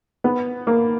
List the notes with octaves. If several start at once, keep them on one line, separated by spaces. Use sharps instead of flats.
B3
A#3